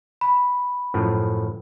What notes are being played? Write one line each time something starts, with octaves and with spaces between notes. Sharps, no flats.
B5
F#2 A2 F3